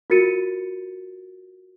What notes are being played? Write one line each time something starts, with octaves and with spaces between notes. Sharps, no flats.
F4 F#4 A#4 A6 C#7 D#7